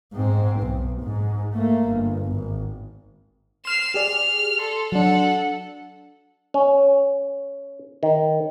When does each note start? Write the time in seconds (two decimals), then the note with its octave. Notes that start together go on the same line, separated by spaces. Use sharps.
0.14 G#2 C4
0.61 B1
1.03 G#2
1.54 A3 A#3
1.89 G1
2.33 G#1
3.65 C6 F6 C7 E7
3.94 G4 G#4 D5 F6
4.59 A4 C6 C7
4.92 F#3 D4 A4 F#5
6.54 C#4
8.03 D#3